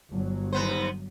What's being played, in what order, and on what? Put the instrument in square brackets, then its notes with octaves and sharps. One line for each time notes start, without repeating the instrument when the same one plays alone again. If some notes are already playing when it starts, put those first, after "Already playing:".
[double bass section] G1 F#3
[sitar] D#2 B3 C5